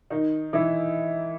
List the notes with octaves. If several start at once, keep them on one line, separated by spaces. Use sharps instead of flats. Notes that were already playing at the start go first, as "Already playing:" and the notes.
D#3 D#4
E3 E4